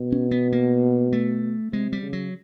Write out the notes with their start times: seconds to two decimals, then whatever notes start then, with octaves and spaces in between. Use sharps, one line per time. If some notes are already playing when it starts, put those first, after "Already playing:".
Already playing: B2
0.12 C#4
0.31 B3
0.52 A#3
1.13 A3
1.72 C3 G#3
1.92 G3
2.02 C#3
2.13 F#3